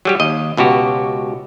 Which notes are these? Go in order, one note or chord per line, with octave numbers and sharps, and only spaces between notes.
F#3 G3 G4
D#2 D#5
C#2 B2 F#4 G4